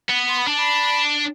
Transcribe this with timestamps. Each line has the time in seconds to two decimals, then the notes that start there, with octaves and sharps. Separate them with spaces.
0.10 B3
0.29 C6
0.39 B5
0.48 D4 A5
0.59 B5